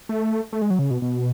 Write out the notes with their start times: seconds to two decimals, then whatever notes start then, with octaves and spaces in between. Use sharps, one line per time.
0.09 A3
0.53 A3
0.62 G#3
0.70 F#3
0.79 C#3
0.91 B2
1.02 B2